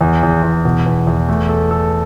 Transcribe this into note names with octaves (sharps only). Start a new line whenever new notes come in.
E2
E2
E2
B2
E2
E2
A3
A4
A4